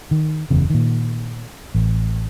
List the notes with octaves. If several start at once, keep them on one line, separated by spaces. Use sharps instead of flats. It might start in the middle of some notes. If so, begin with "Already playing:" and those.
D#3
F#1 E2 C#3
A#2 D#3
A1